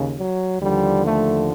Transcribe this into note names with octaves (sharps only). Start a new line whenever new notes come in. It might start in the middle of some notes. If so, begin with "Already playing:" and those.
Already playing: D#2 C#3
F#3
D#2 D3 F3 G3
A3